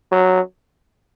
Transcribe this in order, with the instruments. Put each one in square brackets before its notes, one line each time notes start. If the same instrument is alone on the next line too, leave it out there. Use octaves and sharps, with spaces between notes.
[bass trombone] F#3